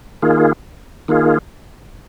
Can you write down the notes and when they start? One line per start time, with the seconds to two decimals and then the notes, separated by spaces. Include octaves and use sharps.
0.22 D#3 A#3 F4 G#4
1.08 D#3 A#3 F4 G#4